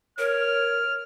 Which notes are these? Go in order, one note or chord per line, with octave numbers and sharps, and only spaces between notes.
A#4 C#5 F6